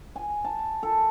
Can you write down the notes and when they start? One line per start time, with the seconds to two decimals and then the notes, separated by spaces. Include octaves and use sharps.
0.16 G#5
0.45 A5
0.83 A4